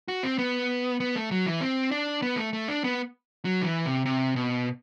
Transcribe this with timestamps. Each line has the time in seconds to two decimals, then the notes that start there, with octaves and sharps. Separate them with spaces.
0.08 F#4
0.23 C4
0.38 B3
1.00 B3
1.16 A3
1.31 F#3
1.46 E3
1.61 C4
1.91 D4
2.22 B3
2.37 A3
2.53 A3
2.68 D4
2.84 B3
3.45 F#3
3.62 D3
3.65 E3
3.86 C3
4.05 C3
4.36 B2